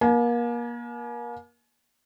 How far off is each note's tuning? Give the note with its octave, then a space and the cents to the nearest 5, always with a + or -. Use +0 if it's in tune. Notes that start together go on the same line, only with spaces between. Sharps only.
A#3 +35 G#5 +40